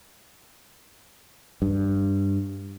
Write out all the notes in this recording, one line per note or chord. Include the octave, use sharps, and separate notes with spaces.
G2